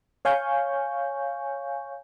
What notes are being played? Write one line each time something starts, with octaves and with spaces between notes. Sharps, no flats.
C#5 F5 G#5 C#6 G6